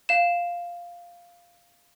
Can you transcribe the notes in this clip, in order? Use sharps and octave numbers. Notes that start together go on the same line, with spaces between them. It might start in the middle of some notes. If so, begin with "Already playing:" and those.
F5 E7